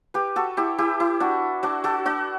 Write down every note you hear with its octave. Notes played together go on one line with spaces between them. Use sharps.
G4 B4
F#4 A4
E4 G4
E4 G4
E4
D4 F#4
D4 F#4
F#4 A4
D4 F#4